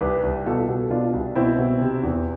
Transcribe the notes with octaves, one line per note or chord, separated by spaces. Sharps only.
C2 G4 B4
C2
B2 F4 A4
B2
B2 D4 F4
C2
B2 C4 E4
B2
C3
E2